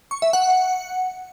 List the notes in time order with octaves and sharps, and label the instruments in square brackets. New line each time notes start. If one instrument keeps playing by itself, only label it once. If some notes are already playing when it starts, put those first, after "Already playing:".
[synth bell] C#6
E5
F#5